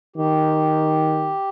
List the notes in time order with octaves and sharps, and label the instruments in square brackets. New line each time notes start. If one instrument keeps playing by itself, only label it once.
[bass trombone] D#3 [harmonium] G4